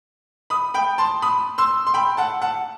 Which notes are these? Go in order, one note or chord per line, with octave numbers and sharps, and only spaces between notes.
B5 D#6
G5 B5
A5 C6
B5 D#6
C6 E6
C6
G5 B5
F#5 A5
F#5 A5